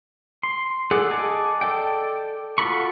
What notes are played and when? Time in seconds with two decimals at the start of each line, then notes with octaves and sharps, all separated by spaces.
0.43 C6
0.91 G#4 A4 D5 F#5
1.10 D#5 G#5 A5 D6
1.61 A4 D5 G5
2.58 F4 F#4 A4 B5 C#6